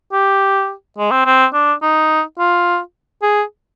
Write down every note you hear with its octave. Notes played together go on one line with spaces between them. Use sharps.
G4
G#3
C4
C4
D4
D#4
F4
G#4